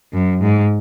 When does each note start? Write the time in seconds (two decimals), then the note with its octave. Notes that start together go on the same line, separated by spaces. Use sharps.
0.12 F#2
0.41 G#2